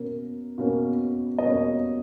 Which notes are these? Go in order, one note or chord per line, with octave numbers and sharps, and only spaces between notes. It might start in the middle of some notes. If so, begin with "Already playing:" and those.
Already playing: B2 A#3 C#4 A#4
B2 A#3 C#4
D#5
B2 A#3 C#4 C#5